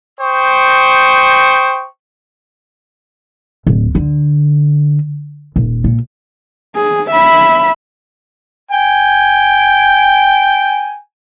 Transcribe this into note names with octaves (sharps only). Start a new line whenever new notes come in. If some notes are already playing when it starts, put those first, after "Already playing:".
C5 G5 C#6 D#6
D1
D3
D#1
A#2
G#4
E5 B5
G5 G#5